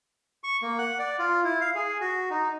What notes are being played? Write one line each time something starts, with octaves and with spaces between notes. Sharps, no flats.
C#6
A#3
F#5
D5
F4
E4
F5
G#4
F#4
D#4